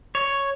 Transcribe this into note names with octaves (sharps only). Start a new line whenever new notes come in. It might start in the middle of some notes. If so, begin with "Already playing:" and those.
C#5